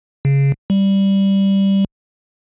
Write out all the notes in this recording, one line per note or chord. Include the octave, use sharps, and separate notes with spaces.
C#3
G3